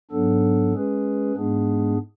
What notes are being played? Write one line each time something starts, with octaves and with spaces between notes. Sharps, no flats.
G#2 F#3 B3 D4 A4
G#3 C#4 G#4 B4
G#2 G#3 B3 D4 G#4